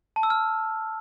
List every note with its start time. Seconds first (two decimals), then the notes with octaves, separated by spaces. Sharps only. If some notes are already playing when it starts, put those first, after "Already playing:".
0.16 A5
0.23 E6
0.30 F6